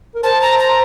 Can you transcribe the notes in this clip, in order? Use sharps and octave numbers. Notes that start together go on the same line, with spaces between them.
A#4
C5 A5
A#5
A#5